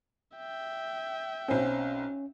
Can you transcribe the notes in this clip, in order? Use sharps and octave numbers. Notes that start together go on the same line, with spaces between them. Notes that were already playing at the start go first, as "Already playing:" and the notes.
E5 G5
B1 C4 C#4